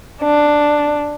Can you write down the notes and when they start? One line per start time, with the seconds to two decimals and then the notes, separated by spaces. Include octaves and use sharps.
0.22 D4